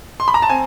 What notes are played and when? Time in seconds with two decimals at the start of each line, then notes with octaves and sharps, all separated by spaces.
0.20 C6
0.28 B5
0.34 A#5
0.42 A5
0.50 C4 G#5